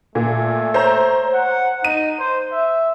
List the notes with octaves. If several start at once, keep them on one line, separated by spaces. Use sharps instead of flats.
A#2 A3
C5 C#5 A#5
F#5
D#4 D#7
C5
E5